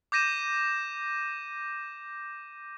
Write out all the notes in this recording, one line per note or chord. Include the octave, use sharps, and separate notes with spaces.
D6 G6 A#6 D#7 E7